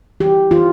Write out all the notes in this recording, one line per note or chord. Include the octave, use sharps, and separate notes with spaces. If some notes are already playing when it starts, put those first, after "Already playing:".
E3 G4
E3 F4